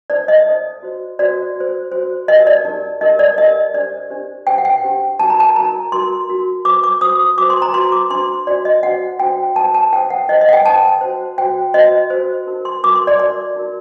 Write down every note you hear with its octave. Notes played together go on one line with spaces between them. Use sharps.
D#4 A4 C5 D5
D#5
D#4 A4 C5
F#4 C5
F#4 C5 D5
F#4 C5
F#4 C5
D#4 G4 A#4 D#5
D5
D#4 G4 A#4
D#4 G4 A#4 D#5
D5
D#4 G4 A#4 D#5
D4 G4 C5 D5
D4 G4 C5
D4 G4 C5 G5
F#5
G5
D4 G4 C5
D#4 F#4 A#4 A5
A#5
A5
D#4 F#4 A#4 A#5
D#4 F#4 A#4 C6
D#4 F#4 A#4
F#4 C5 D6
D6
F#4 C5 D#6
F#4 C5 D6
C6
A#5
F#4 C5 C6
D6
D4 F#4 C5 C6
D4 F#4 C5 D5
D#5
D4 F#4 C5 F#5
D4 F#4 C5 G5
D#4 A4 C5 A5
A5
D#4 A4 C5 G5
F#5
D#4 A4 C5 D#5
D#5
F#5
G5
D#4 A4 C5 A5
F#4 C5
F#4 C5 G5
F#4 C5 D#5
F#4 C5
D#4 F#4 A#4
C6
D#4 F#4 A#4 D6
C6
D5
D#4 F#4 A#4 D5
D#4 F#4 A#4